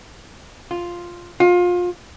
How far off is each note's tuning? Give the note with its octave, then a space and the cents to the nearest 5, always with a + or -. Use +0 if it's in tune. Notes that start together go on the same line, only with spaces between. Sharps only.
F4 +0
F4 +25